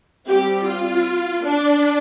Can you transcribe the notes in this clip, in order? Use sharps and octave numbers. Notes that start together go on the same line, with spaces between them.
G3 C4 G4
F4
D4